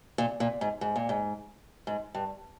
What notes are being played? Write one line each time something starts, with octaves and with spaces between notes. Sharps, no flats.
A#2
A#2
G#2
G#2
A#2
G#2
G#2
G2